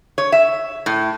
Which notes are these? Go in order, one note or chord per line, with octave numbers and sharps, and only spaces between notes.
C#5
E5
A2